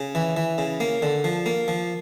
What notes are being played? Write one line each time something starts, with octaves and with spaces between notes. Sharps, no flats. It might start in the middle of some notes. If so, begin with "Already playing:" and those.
Already playing: C#3
E3
E3
C#3
A#3
D3
F3
A#3
F3